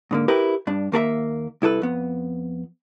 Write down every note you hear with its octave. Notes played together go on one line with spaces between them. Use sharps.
G#2 D3 A#3
E4 G4 A#4 B4
G2 D4
D#2 A#3 A4 E5
C2 E4 A4 B4
F2 B3